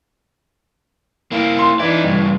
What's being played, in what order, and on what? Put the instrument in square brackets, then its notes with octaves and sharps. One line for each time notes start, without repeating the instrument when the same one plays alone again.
[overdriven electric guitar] A#3 E4
[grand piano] C6
[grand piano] E3 [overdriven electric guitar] D#4 D5
[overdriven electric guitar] G2 C#3